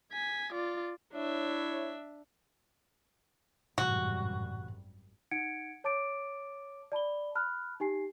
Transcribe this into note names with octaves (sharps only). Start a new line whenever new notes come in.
G#5 B6
F4 D5
D4 E4 C#5 E5
G#1 F#2 A2 C3 E3 G3 F#4
D#4 F#5 G#6 C#7 D7
C#5 A5 D6 A6 D7
D5 A5 B5 G7
A5 B5 F6 F#6
D#4 G4 G#5 C7